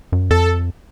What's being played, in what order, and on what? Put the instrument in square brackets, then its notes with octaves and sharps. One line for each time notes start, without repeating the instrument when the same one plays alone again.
[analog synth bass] F#2
[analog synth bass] F2 [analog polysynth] A4